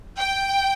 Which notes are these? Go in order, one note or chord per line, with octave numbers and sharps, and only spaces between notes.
G5